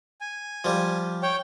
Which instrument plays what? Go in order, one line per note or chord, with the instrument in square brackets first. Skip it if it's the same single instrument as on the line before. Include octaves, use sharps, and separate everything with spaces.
[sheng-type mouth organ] G#5
[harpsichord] F3 G3
[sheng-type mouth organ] C#5 G5